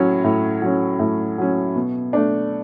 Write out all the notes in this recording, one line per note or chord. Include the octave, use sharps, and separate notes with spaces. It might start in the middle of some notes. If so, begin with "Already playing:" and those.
Already playing: A2 F#3 C#4
A2
F#3 C#4
A2
F#3 C#4
B2
A3 D4